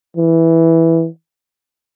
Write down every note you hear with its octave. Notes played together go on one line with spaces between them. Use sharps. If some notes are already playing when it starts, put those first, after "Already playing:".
E3